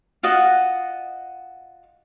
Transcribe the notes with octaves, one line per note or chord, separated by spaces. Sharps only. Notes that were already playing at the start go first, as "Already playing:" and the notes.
F4 F#4 D#5 F#5